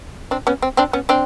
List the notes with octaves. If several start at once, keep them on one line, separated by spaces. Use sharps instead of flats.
C4 D4
B3 C#4
C4
C4 D4
B3 C#4
C4 D4